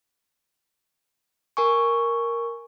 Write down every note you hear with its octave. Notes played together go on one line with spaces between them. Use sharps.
A#4 G#5 C#6